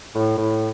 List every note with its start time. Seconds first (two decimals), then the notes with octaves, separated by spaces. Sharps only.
0.14 A2
0.37 A2